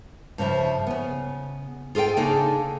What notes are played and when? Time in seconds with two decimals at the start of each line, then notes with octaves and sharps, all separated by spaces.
0.38 G2 C#3 F3 E5
0.87 C#3 B3
1.95 F4 G#4 A4 D#5 G5
2.17 C#3 A#3 D4 D#4 G#4 A4